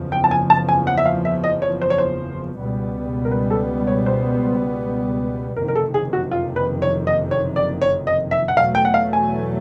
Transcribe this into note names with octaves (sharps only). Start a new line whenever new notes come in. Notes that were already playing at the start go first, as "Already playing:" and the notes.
Already playing: F#1 E2 C#3 F3
G5
A5
G#5
A5
G#5
F#5
E5
F5
E5
D#5
C#5
C5
C#5
C5
C#2 B2 G3 B3
A#4
B4
A4
C#5
C5
F#1 F2 C3 D#3 A#4
A#4
A4
G#4
F#4
F4
B4
C#5
D#5
C#5
D5
C#5
D#5
E5
F#5
E2 B2 F#3 A3 F5
G5
F#5
F5
G#5